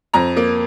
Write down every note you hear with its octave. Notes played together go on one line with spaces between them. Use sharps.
F2 A#5
A#3